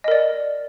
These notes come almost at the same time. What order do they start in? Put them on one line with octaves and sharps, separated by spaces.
D#5 A#4 D5